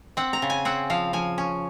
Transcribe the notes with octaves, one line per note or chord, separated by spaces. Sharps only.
C4 F#5
A#5
C#3
G#5
C4 F#5
F3 F5
F3 G#5
C#4